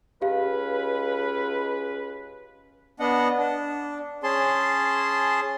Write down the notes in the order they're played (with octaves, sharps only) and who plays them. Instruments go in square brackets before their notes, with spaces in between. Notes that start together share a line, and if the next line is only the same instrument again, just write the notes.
[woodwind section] C#2 C#4 B4 [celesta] G4 F5
[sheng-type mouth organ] B3 D4 D#5 F#5
D4
C#4 G#4 A5 C6